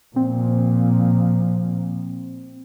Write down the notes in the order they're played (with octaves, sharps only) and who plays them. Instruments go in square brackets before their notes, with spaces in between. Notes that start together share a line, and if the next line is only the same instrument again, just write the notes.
[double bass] A#2 F3 [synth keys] C4